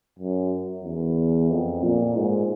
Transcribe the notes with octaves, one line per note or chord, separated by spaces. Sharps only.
F#2
E2
F2
A#2
G#2